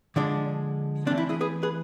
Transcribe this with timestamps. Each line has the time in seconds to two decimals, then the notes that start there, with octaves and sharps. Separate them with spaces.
0.16 D3 F3 G#3 D4
1.06 E3 A3 C4 D4
1.18 E4
1.29 E4 G#4
1.41 G#4 B4
1.63 G#4 B4